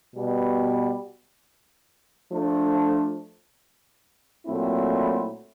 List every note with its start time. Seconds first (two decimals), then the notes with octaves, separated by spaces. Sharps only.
0.15 B2 G3 B3
2.31 F3 A3 D4
4.46 A#2 F#3 A3 C4 E4